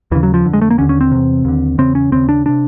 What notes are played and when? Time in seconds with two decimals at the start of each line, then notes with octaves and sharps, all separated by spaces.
0.12 D#2 C#3 E3
0.23 F#3
0.34 F3
0.45 F2 D3
0.53 G#3
0.61 A3
0.70 A#3
0.78 D#2 D3 C#4
0.89 C#4
1.01 C4
1.11 E2 C3
1.45 D#2 D3
1.78 E2 C#3 C4
1.95 C#4
2.12 D#2 C#3 C4
2.29 D4
2.46 C3 D4